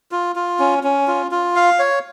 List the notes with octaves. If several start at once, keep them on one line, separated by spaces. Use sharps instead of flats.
F4
F4
C#4
C#4
F4
F4
F5
C#5